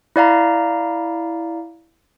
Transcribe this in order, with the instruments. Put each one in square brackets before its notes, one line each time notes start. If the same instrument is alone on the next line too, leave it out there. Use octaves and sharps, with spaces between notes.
[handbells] E4 D5 F5 A#5